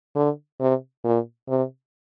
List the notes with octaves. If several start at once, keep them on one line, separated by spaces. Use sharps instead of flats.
D3
C3
A#2
C3